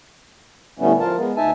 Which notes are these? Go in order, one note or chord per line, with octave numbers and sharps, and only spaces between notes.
A2 D3 G3 A3 B3 C#4
F3 F4 A#4 A5
G#3 B3
D2 D#4 E5 G#5 A5